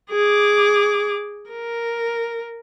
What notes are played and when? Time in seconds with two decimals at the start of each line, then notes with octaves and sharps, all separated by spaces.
0.11 G#4 D6
1.50 A#4